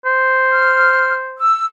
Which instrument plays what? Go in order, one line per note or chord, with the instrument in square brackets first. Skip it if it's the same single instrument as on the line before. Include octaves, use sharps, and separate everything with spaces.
[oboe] C5
[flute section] F6
E6